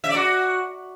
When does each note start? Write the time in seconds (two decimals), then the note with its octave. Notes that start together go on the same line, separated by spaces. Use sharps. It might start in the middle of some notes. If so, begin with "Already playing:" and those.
0.04 E5
0.09 D5
0.15 F#4